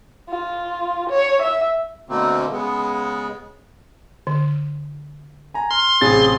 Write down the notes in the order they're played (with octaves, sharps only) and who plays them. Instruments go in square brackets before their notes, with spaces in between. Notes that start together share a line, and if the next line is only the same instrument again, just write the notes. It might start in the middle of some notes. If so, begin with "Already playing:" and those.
[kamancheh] F4
C#5
E5
[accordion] B2 D3 A3 A#3 C4
C#3 G#3 B3
[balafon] D3
[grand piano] G#5 A#5
[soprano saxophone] C6 [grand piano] F6
[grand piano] A1 C3 A6 [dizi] G#4